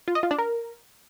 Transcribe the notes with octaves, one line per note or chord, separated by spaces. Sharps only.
F4
D#5
F4
D4
A#4